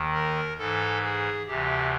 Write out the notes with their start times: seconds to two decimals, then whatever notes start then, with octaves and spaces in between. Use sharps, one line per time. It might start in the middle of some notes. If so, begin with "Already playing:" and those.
Already playing: D#2 D#3
0.13 A#4
0.58 G#2 E3 A4
1.03 G#4
1.47 D2 C3 E3 G4